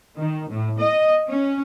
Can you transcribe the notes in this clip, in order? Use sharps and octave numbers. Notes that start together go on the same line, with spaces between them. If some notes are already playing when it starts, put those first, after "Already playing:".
D#3
A2
D#5
C#4